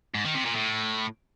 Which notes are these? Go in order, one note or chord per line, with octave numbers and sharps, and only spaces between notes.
G#2
D#3
C3
A#2
A2